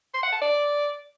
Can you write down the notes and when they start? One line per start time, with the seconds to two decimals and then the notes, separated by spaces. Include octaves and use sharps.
0.14 C6
0.23 F#5
0.32 A5
0.42 D5